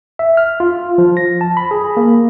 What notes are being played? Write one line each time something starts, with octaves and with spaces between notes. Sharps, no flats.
E5
F6
F4
F3
A#6
A5
B5
G#4
A#3